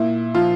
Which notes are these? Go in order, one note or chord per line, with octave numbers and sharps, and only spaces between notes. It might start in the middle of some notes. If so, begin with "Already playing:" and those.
Already playing: A#2 E4
F3 F4